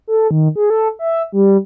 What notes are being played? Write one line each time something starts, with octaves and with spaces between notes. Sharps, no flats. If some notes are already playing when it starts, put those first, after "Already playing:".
A4
D#3
G#4
A4
E5
G3